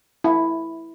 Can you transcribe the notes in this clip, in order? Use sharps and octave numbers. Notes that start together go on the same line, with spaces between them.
E4